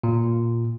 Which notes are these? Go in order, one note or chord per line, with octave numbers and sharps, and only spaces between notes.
A#2